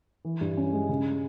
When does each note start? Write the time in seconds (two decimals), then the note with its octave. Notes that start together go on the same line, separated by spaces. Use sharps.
0.25 E3
0.41 G2
0.57 C#4
0.73 G#3
0.89 C#3